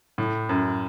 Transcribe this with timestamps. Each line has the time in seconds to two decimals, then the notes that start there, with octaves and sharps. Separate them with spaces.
0.18 A2
0.49 F#2